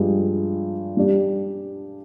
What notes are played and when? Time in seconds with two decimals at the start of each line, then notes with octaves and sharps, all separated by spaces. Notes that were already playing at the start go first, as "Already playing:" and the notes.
Already playing: G2 F3 G#3 D4 G4
0.97 G3 D4 G4 D5